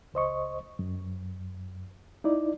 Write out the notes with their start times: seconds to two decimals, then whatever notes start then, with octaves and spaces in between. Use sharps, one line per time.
0.14 C#2 C5 D#5 C#6
0.79 F#2
2.24 D#4 E4 D5